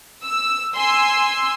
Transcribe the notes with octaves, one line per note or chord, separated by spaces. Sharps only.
E6
G#5 C6 E6